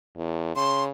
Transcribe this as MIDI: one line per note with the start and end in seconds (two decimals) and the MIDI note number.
0.17 0.56 40
0.56 0.91 49
0.56 0.83 84